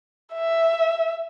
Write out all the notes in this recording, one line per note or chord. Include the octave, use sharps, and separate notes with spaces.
E5